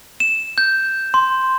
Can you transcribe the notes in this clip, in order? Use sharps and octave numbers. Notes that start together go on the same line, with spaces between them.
E7
G6
C6